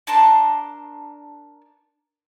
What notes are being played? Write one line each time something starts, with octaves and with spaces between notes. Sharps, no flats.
D4 A#4 A5 C6